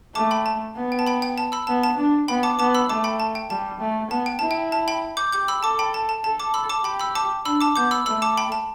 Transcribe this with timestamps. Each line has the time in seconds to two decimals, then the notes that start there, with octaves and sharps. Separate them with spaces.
0.15 A3 A5 D6
0.31 G5 B5
0.46 A5
0.76 B3
0.92 G5
0.99 A5
1.07 G5 B5
1.22 G5
1.38 A5
1.52 B5 E6
1.67 B3 A5
1.83 A5
1.98 D4
2.28 B3 G5 B5
2.43 A5 D6
2.59 B3 A5 D6
2.74 B5 E6
2.89 A3 A5 D6
3.04 G5 B5
3.20 A5
3.35 G5
3.50 G3 A5
3.80 A3
4.11 B3 A5
4.26 G5
4.39 E4 A5
4.51 G5
4.72 A5
4.88 G5 B5
5.17 D6 G6
5.32 G4 D6 G6
5.48 B5 E6
5.63 A4 A5 D6
5.79 G5 B5
5.94 A5
6.09 A5
6.24 A4 A5
6.40 A5 D6
6.54 B5 E6
6.69 A5 D6
6.84 G4 G5 B5
6.99 B5 E6
7.15 A5 D6
7.45 D4 B5 E6
7.61 A5 D6
7.76 B3 D6 G6
7.91 B5 E6
8.06 A3 B5 E6
8.22 A5 D6
8.37 G5 B5
8.52 A5